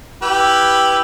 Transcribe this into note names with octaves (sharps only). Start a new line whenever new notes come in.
E4 G4 B4